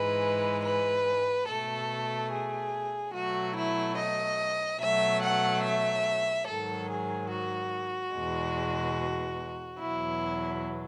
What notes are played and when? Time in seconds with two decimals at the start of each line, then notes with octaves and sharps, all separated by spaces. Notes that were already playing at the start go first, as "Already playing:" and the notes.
Already playing: G#2 E3 G#3 B4
0.64 B4
1.48 B2 A3 A4
2.31 G#4
3.14 B2 F#3 A3 F#4
3.56 E4
3.97 D#5
4.80 B2 F#3 A3 E5
5.22 F#5
5.64 E5
6.48 G#2 D#3 F#3 A4
6.89 G#4
7.31 F#4
8.14 E2 B2 G#3
9.80 E2 B2 F#3 E4